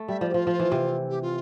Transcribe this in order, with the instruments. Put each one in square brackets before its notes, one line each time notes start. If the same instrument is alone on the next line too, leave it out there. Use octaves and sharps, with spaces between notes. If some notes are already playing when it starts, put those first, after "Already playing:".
Already playing: [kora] A3
[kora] G3 [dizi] E5
[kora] F3 [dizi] D5
[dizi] G4
[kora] F3 [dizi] F4
[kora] F3
E3
C3
[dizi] G4
F4